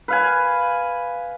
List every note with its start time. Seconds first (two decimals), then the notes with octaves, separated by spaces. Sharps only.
0.08 B4 F5 G#5